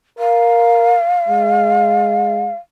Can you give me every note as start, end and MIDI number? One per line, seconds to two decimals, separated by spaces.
0.19 0.96 70
0.19 2.55 77
1.28 2.51 56